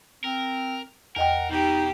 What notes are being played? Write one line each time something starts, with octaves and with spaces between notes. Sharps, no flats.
C4 A#4
E2 A#4 D#5 F#5 G5
B2 D#4 G4